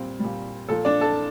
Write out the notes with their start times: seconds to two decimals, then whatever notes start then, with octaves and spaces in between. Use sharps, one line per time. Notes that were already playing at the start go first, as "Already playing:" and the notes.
Already playing: A#2 G3 C4
0.20 A#2 G3
0.69 A#2 F3 A4
0.85 D4 D5
1.01 A4 A5